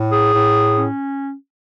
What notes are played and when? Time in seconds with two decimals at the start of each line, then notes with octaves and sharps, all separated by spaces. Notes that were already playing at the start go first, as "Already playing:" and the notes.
Already playing: A2
0.12 G#4
0.33 A2
0.74 C#4